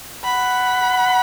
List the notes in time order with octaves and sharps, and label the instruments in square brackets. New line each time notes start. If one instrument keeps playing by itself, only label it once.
[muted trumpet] F#5 [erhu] B5